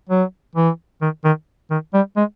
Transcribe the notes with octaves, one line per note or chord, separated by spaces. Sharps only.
F#3
E3
D#3
D#3
D#3
G3
G#3